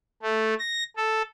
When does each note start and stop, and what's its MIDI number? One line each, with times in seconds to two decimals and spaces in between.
0.22 0.54 57
0.59 0.83 94
0.97 1.22 69